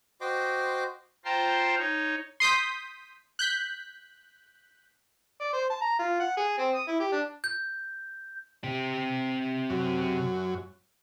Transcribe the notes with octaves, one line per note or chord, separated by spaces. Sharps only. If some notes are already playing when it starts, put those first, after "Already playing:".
F#4 C5 D#5 G5 C6 D6
F4 C5 G5 A5 A#5 C6
D#4 C#5
C6 D#6 G6 B6
F#6 G6 B6
D5
C5
A5
A#5
F4
F#5
G#4
C4
D#6
E4
G4
D4
G6
C3 G4
F#2